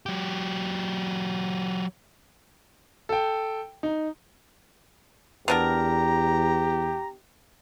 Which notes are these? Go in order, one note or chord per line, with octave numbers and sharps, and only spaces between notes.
F#3 G4
A4 G5
D#4
E2 B3 D4 G4 A#4 A#5